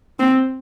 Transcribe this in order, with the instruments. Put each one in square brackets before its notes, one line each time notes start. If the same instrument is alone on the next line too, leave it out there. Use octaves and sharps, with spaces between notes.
[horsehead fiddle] C4